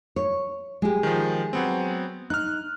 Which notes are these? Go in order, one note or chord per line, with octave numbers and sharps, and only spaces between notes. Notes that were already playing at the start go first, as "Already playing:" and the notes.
C#5
G#3 G4
D#3 F3
F#3 B3 C4
D#4 F6 F#6